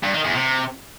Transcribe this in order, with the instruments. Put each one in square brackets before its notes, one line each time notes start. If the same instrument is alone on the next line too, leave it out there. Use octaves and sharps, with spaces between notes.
[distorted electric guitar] G2
D#3
E2
C3